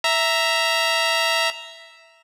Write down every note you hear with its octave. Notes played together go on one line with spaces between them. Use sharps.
E5 A#5